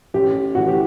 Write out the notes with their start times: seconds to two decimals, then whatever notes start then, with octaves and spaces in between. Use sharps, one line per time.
0.14 A1 G4
0.55 A2 E3 F#4
0.67 G4